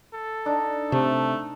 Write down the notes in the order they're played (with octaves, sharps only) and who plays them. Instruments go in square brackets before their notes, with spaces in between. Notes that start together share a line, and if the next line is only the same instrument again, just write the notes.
[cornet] A4
[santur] D4 D#4
[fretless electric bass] C3 [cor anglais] A3